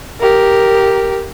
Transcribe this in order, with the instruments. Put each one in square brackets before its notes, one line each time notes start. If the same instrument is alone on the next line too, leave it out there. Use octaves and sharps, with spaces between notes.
[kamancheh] G4 A#4